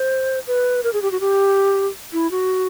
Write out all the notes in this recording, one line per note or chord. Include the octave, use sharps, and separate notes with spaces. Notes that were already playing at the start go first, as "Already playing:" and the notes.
Already playing: C5
B4
A#4
G#4
G4
F#4
G4
E4
F#4